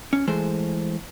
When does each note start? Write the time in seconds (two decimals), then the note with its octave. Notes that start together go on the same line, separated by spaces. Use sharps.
0.13 C#4
0.27 E3 G#3 A3 C5